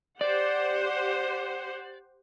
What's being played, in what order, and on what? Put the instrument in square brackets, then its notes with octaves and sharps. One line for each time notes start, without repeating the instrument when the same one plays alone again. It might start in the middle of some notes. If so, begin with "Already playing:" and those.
[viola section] G4 C5 F#5 [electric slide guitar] D5